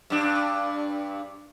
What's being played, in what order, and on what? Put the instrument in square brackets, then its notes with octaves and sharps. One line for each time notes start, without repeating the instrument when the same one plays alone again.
[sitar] G2 D4